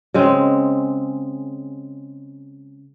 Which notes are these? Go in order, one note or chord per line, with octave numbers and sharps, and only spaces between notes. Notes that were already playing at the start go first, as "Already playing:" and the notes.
C#3 G#3 C4